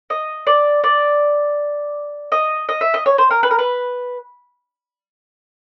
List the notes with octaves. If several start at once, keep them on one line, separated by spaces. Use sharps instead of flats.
D#5
D5
D5
D#5
D#5
E5
D#5
C#5
C5
A#4
B4
A#4
B4